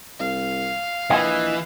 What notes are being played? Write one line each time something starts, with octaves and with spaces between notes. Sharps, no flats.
C2 F5
A#1 E3 D#5 G#5